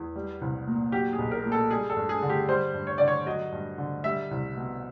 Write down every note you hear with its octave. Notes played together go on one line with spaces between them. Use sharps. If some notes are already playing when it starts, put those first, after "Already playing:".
Already playing: E2
G3
C2
A#2
F#3 G4
G#4
B1
A#4
A#2
A4
G3 G#4
A4
G2
G#4
D3
G4
G3 C5
G2
C#5
D3 D5
C#5
F#3 D#5
G2
D3
G3 E5
C2
B2